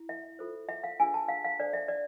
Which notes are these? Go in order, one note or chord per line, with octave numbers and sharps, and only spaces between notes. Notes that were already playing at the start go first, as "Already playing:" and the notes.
Already playing: E4
E5
F4 A4 C5
E5
F5
D4 F4 G#4 B4 G#5
A5
F5
F5
D4 A4 C5 D5
E5
D5